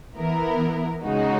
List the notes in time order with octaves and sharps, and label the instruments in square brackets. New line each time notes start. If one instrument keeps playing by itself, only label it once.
[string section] E3 B3 E4 A#4
C#3 G#3 D#4 F#4